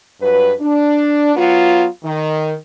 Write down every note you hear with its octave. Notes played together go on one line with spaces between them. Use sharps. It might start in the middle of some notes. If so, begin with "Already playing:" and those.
G2 F#3 B4
D4
F#3 B3 F4
D#3